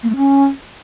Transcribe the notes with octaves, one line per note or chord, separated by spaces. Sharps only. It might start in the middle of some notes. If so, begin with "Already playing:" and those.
A#3
A3
C#4